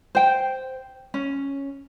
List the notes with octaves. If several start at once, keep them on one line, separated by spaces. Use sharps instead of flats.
C5 G5
C#4